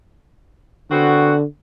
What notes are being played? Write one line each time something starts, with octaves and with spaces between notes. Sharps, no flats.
D3 B3 C4 F#4